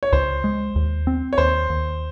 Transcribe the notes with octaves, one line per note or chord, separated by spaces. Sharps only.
C#5
C#2 C5
G#3
D#2
C4
C#5
D#2 C5
D#2